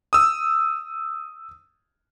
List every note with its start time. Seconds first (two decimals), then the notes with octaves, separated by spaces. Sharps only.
0.13 D#6 E6